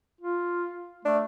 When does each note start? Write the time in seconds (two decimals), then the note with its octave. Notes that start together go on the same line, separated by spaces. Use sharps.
0.21 F4
1.05 A3 D4